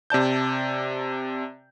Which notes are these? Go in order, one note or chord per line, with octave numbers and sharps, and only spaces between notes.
C3 D5 A5 G6